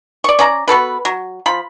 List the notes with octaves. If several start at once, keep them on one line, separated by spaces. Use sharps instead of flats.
D5 C#6
C#4 D5 A#5
B3 F#4 A4 B4
F#3
F3 B5